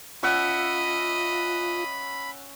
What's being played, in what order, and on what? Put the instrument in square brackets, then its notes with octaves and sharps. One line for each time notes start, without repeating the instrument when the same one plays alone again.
[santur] C#4 E5 F#5 [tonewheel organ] F4 [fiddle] D#5 [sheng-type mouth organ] B5